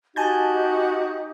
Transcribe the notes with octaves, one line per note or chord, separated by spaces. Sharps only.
D#4 F#4 G4 G#5 A5 G6